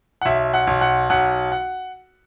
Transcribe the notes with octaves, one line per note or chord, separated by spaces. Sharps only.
F#5
B1 E5
F#5
B1
F#5
B1 F#5
F#5